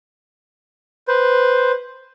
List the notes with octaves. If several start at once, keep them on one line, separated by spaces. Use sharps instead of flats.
B4 C5